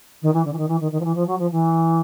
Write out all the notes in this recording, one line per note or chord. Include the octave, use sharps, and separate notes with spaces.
D#3
E3
D3
E3
D#3
E3
D#3
D#3
F3
E3
F3
F#3
F3
E3